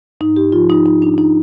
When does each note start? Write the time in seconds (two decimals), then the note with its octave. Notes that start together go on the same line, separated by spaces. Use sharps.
0.21 G#2 D#4
0.36 G4
0.52 F3 F4
0.70 D#4
0.86 G#2 D#4
1.02 D4
1.18 F3 D#4